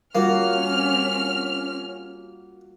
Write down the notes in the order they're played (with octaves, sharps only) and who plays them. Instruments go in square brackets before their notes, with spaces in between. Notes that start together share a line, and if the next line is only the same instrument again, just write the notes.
[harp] G3 F4 F#4 [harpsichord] A#3 [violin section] C#4 F6